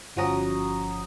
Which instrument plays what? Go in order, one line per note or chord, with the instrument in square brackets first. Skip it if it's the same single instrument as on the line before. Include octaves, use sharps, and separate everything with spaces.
[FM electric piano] G1 F3 C#4 F#4 A#5 D#6